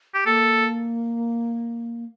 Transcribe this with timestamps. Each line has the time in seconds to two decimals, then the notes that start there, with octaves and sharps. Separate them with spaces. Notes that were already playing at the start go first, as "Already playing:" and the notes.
0.14 G4
0.26 A#3 A4